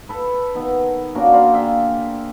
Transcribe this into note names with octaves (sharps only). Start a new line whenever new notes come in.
A4 B4
D#3 B3
A#3 C#4 D4 F#4
C5 D5 F5 A#5
G#4 E5 F5 G5